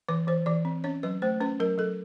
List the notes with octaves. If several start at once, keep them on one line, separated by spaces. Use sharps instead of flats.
E3 B4
E3 C5
E3 D5
C4
C#4 C#5
F#3 B4
A3 C5
C#4 B4
F#3 A#4
F#3 A4